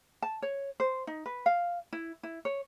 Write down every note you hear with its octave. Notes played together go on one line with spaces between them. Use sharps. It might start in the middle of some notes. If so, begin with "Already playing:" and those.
A5
C#5
C5
D#4
B4
F5
E4
E4
C#5